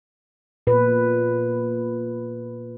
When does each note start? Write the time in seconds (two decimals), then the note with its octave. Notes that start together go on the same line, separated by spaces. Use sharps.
0.67 A#2 B4